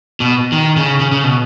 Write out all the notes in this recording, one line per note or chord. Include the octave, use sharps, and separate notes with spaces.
B2
D#3
C#3
C#3
C#3
B2